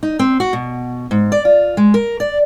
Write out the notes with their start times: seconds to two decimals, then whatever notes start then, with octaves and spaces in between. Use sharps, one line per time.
0.03 D#4
0.19 C4
0.40 F#4
0.53 B2
1.11 G#2
1.32 D5
1.45 F4
1.77 G#3
1.94 A#4
2.20 D5